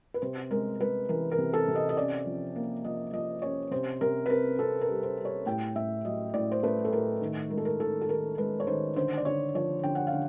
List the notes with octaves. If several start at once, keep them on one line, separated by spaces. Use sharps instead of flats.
B4
C3 C5
G#3 A#4
G#3 B4
E3 A#4
A#4
C3
A4
C3
D#5
D#5
C#4 D5
F3
A#3
F3 D#5
F3 D#5
C#4 C#5
C3 C5
C3 A#4
B4
C4 A#4
C4 A4
A#4
G3
C5
G3
C#5
A2 G5
A2 E5
F#3 D#5
A2 D5
C5
A3 B4
A4
A2 A#4
D#3
G#3 A#4
A4
A#4
D#3 A4
A4
D#3 A#4
G#3 B4
C#5
D#3 C5
D3 C5
D5
D3 C#5
F3 C#5
D3 G5
F#5
F5
D3